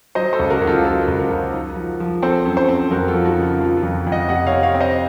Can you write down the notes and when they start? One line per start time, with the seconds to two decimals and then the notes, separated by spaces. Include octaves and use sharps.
0.15 F#3 C5 D#5
0.33 A4 C5
0.39 C#2
0.50 F#4 A#4
0.61 C#2
0.67 F4 A4
0.85 F#3 F4 A4
1.08 C#2
1.19 F#4 A#4
1.31 C#2
1.53 D#4
1.76 F3
2.00 F3
2.22 C4 A4 C5
2.45 F#2
2.57 A4 C5
2.69 C4
2.91 F2 F#4 A#4
3.08 F4 A4
3.14 F3
3.26 D#4 F#4
3.37 C#3
3.43 F4
3.60 F3 F4
3.77 F4
3.83 F2
4.07 F2
4.12 D#5 F#5
4.29 C3 D#5 F#5
4.47 C#5 F5
4.52 C4
4.63 C#5 F5
4.74 C4
4.81 C5 D#5